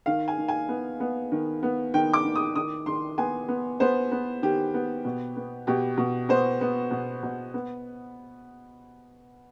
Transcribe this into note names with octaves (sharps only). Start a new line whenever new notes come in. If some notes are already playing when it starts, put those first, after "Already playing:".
D#3 F5
G#5
D#3
G#5
B3
B3
D#3
B3
D#3 G5
D6
D#3
D#6
D#3 D#6
D#3 C6
B3 G#5
B3
B3 C5
B3
D#3 G4
B3
B2
B3
B2 G4
B2
B3 C5
B3
B2
B2
B3